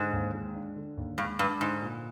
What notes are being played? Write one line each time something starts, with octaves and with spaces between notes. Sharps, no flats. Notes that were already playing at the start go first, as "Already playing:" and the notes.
Already playing: G#2 D3
D#2
G#3
D4
D3
D#2
G2 G#3
G2 D4
G#2 D3
A#2